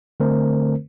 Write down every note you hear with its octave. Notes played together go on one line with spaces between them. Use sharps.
D3 A3 C4 A#4 C5